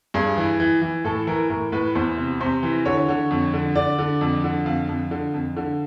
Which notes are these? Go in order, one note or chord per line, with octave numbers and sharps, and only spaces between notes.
G2 G#4
E3
E3
E3
A2 A4
E3 A#4
A2 A#4
A2 B4
E2 C5
C3
C3 C5
E3
D3 C#5
D3
F2
D3
D3 D5
D3
F2
D3
F2 F5
F2
D3
F2
D3